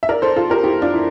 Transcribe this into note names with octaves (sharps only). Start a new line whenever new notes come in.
E5
A#4 D5
A4 C5
F4 A4
G4 A#4
E4 G4
D4 F4
E4